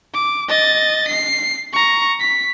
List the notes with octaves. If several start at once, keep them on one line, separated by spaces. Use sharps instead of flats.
D6
D#5 A6
C7
A#5 C#6
B6